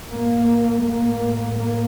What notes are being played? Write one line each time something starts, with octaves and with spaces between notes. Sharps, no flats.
A2 A#3
A#3
A#3